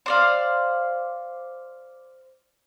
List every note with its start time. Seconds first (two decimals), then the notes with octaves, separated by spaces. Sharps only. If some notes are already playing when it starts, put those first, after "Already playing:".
0.06 C5 D5 F5